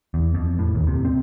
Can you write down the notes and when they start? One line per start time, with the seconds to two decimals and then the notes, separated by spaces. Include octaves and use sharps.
0.14 E2
0.34 F2
0.59 A2
0.75 D#2
0.87 C3
1.05 C4